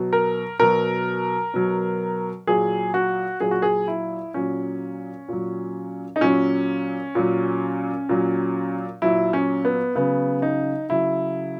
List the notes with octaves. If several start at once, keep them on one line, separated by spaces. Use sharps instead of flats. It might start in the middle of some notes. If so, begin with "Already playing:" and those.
Already playing: B2 F#3
A#4
B2 F#3 A#4
B2 F#3
A#2 F#3 G#4
F#4
A#2 F#3 G#4
F#4
G#4
E4
A#2 F#3 C#4
A#2 F#3
D#4
A#2 F#3 C#4
A#2 F#3
A#2 F#3
A#2 F#3 E4
C#4
B3
C#3 F#3 B3
D#4
C#3 F#3 E4